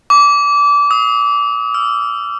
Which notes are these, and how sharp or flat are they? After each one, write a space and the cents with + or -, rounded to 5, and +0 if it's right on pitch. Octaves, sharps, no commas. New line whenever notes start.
D6 -25
D#6 +40
E6 +45